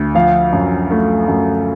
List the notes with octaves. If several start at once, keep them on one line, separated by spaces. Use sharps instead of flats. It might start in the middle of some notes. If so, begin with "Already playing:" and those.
Already playing: D2
F3 F5
F#2
A3
F#2